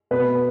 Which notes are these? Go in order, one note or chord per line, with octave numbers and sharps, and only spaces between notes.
B2 B4